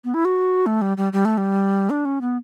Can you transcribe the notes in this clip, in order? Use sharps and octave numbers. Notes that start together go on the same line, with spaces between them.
B3
E4
F#4
A3
G3
G3
G3
A3
G3
D4
C#4
B3